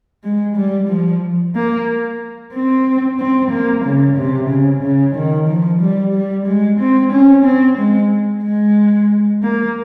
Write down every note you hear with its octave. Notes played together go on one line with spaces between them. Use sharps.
G#3
G3
F3
A#3
C4
C4
A#3
C#3
C3
C#3
C#3
D#3
F3
G3
G3
G#3
C4
C#4
C4
G#3
G#3
A#3